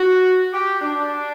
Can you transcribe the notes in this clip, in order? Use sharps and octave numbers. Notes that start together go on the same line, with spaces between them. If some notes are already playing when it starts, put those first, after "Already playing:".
Already playing: F#4
G4
D4